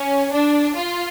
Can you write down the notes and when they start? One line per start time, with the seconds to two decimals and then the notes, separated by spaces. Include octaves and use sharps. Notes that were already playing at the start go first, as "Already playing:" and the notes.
Already playing: C#4
0.34 D4
0.76 F4